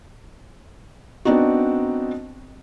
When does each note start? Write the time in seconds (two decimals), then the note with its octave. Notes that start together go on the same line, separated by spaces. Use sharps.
1.25 B3 C4 D4 D#4 F#4